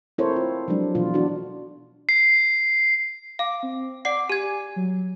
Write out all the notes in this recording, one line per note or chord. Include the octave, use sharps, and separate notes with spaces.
C4 E4 A4 A#4 C5 C#5
F4
F3 F#3 G#3 D4
B2 E3 F4
D4 F#4
C7
F5 D6
C4
D5 F#5 D6 C7
G4 G#5 G#6
F#3